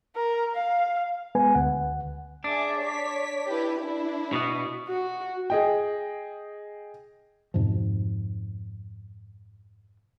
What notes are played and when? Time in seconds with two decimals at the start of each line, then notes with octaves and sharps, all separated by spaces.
0.16 A#4
0.55 F5
1.35 G#3 B3 B4 G#5
1.55 D2 F#5
2.44 D4 G#4 E5
2.79 C#5 B6
3.48 E4 G4 B4
3.79 D4 E4
4.33 B2 B3
4.88 F#4
5.50 G#4 D#5 G5
7.54 F2 G#2 B2 F3